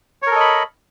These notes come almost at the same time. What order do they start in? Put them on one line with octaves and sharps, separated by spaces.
C#5 A#4 A4 D#5 B5